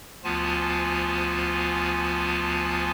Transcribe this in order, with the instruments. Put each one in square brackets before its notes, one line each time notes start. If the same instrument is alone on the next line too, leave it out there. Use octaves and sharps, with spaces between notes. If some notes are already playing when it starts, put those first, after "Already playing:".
[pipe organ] D2 F3 B3 F4 G#5 A5